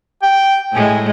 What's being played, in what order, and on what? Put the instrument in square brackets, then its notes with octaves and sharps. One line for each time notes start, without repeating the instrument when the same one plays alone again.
[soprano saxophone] G5
[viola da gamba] A2 G#3 [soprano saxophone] G#5